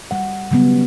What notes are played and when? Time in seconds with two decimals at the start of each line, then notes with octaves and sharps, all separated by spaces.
0.11 G3 F#5
0.51 C#3 F#3 G3 B3